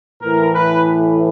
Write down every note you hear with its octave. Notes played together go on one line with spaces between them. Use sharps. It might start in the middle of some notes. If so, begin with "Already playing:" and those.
A2 E3 A#4
B4